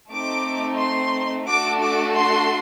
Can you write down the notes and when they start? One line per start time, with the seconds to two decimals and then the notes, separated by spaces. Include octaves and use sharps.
0.11 A3 C4 D#4 D6
0.80 C6
1.48 A3 D4 F#4 A4 D6
1.83 D6
2.17 C6